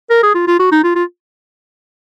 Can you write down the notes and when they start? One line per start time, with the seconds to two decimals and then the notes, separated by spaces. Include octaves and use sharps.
0.10 A#4
0.23 G#4
0.35 F4
0.47 F4
0.59 F#4
0.72 D#4
0.83 F4
0.95 F4